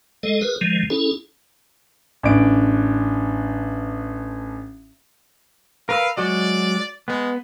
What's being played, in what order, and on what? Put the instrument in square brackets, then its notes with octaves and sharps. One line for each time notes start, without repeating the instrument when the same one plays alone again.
[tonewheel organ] G#3 A4 D#5
G#4 A#4 B4
D#3 F3 G#3
C#4 E4 G#4 A4
[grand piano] A1 D4 D7
[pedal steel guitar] A#4 B4 E6 [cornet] F5
[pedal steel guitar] F#3 G#3 F#4 [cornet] D5
[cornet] G#3 [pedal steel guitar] B3